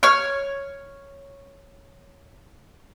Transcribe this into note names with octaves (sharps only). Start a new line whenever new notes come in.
C#5 F6